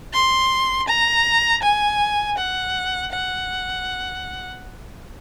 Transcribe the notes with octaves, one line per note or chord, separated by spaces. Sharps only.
C6
A#5
G#5
F#5
F#5